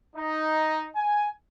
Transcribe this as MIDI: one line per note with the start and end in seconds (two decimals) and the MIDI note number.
0.16 0.88 63
0.95 1.28 80